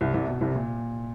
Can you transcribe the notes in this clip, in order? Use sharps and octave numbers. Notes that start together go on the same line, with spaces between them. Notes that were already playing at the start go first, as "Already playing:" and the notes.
C2 C3
C2 C3
B2
C2 C3
A#2